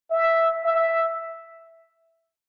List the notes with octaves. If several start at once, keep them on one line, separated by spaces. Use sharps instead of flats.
E5
E5